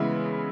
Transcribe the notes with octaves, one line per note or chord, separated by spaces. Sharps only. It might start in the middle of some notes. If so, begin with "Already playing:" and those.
Already playing: C#3 E3 G#3 B3 E4